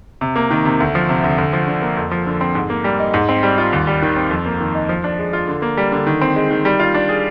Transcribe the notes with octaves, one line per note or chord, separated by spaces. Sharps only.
C3
A#3
D#3
C3
D2
F3
C3
D2
D2
F3
D3
A#3
F2
F3
D3
C4
G#2
A#3
G3
D#4
G#2
C4
G3
F4
D#2
G3
D#3
C4
F2
A#3
D#3
D#4
F3
D4
G#3
F4
D3
A#3
G3
D3
D#3
C4
G#3
D#3
G3
F4
D4
G#4